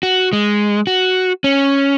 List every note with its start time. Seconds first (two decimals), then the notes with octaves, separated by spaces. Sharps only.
0.03 F#4
0.33 G#3
0.87 F#4
1.44 C#4